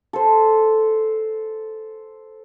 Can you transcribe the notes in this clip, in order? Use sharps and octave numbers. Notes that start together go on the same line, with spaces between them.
A4 C5